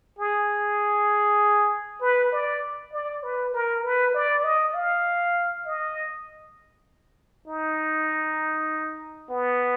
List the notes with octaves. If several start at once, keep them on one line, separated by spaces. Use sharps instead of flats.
G#4
B4
D5
D5
B4
A#4
B4
D5
D#5
F5
D#5
D#4
B3